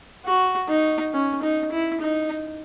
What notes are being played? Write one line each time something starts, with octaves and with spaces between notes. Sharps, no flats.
F#4
D#4
C#4
D#4
E4
D#4